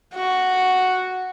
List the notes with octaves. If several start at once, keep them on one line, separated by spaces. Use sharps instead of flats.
F#4